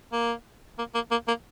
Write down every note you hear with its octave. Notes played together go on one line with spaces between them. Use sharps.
A#3
A#3
A#3
A#3
A#3